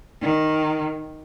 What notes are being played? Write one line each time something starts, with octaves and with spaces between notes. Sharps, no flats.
D#3